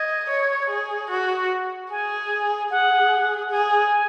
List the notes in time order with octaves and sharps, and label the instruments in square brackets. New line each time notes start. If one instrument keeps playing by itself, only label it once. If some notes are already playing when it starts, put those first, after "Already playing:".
Already playing: [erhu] D#5 [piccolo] G#6
[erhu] C#5
G#4
F#4
[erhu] G#4 [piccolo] G#5
[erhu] G#4 [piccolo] F#5
[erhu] G#4 [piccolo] G#5